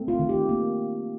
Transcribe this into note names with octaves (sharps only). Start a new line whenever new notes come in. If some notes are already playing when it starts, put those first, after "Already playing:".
Already playing: A3 C4
F4
D#3
G4
A#3